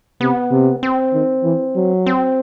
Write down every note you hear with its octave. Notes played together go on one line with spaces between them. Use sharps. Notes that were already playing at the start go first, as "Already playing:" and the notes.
C3 B3
C3
C4
D#3
E3
F#3
C4